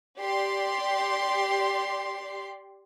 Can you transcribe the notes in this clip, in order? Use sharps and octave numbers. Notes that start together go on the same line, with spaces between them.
G4 D5 C6